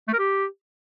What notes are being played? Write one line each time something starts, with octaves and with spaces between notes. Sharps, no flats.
A3
A#4
G4